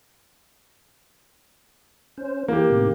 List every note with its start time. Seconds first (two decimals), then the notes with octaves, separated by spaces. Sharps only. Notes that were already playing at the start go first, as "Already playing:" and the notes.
2.18 C#4 C5
2.48 E3 A#3 G4
2.70 A2 C3 D#3